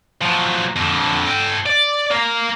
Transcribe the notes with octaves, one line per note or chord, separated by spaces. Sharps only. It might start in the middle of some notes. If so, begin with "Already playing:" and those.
F3 F#3
F2 D3
A4 G5
D5
A#3